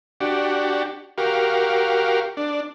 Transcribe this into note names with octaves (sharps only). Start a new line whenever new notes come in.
D4 F#4 G4
F#4 G4 A#4 F5
D4